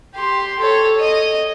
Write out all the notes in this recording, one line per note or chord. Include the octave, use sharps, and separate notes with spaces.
G4 C6
A4 C#5
D#5 D#6